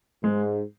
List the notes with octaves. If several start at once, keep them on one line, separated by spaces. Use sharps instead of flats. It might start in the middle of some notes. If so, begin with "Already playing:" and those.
G#2 G#3